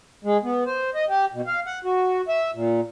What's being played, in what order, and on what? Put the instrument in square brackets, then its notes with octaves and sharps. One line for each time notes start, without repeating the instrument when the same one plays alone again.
[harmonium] G#3
B3
C5
D#5
G4
B2
F5
F#5
F#4
E5
A#2